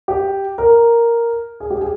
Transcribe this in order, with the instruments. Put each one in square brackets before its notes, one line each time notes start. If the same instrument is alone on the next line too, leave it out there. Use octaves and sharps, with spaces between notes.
[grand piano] G4
A#4
G#4
G4
G#4